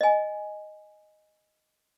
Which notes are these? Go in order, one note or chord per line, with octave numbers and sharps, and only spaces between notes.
D#5 G#5